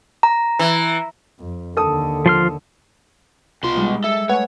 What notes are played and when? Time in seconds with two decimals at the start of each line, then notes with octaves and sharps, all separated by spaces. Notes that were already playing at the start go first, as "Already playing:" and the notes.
0.23 A#5
0.59 E3
1.40 F2
1.77 D#2 D3 A4 D#6
2.26 F3 C6 F6
3.63 C2 B2 F4 C6
3.76 G3 G#3 D#4
4.04 G#4 A4 E5
4.29 A3 B4 C#5 F#5 G#5